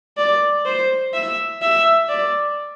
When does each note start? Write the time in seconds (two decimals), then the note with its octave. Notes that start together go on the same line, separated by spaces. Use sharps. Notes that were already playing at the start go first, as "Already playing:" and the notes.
0.18 D5
0.66 C5
1.14 E5
1.62 E5
2.09 D5